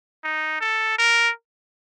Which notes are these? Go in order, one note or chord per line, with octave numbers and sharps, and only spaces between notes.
D#4
A4
A#4